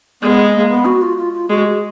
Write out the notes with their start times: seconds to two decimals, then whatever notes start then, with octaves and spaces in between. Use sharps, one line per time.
0.22 G#3 B3
0.53 A#3
0.69 B3
0.85 F#4
1.02 F4
1.17 F4
1.33 F4
1.49 G#3 F#4
1.66 G#4